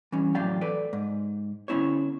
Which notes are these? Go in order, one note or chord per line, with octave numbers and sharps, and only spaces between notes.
E3 G3 C#4
E2 A2 F#3 D5 F5 G5
A4 B4 D5
G#2
D3 B3 C#4 E4 C5 C#5